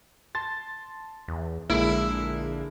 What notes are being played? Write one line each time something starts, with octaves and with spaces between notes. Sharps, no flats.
A5 C6 A6
E2
A#1 D3 G#3 A#3 E4